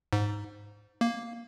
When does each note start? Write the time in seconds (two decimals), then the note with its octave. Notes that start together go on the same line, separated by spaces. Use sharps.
0.13 G#2
1.01 A#3